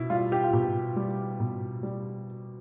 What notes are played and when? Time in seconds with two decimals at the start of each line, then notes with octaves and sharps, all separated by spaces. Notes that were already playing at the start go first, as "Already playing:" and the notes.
Already playing: B2 E4
0.10 G3 F4
0.32 G4
0.44 F4
0.53 B2 G4
0.96 G3
1.40 B2
1.83 G3